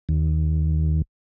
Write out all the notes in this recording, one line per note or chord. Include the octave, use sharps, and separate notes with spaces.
D#2